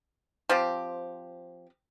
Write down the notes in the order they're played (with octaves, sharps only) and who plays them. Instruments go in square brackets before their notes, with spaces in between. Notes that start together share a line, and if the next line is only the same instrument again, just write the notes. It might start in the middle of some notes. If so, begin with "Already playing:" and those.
[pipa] F3 C4 G4